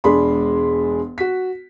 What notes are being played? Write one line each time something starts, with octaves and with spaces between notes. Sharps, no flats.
E1 G#3 D4 G#4 B5 C6
F#4 B6